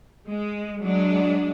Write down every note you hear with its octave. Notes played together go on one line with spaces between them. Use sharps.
G#3
F#3 G#3 D4